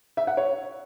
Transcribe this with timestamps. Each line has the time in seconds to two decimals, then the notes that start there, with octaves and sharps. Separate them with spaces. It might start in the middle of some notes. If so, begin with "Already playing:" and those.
0.17 E5
0.27 F#5
0.37 C#5